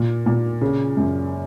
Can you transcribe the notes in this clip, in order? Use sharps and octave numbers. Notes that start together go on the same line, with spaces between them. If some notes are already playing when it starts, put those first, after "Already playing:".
Already playing: A#2
A#2
C#3
F#2